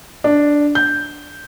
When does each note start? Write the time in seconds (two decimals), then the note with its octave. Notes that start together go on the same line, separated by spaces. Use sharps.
0.24 D4
0.75 G6